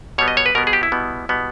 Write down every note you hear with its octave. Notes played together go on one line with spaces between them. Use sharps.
B2 G3 B3 C#5
D#5
C#5
B4
B2 G3 B3 A#4
G#4
G4
E4
B2 G3 B3
B2 G3 B3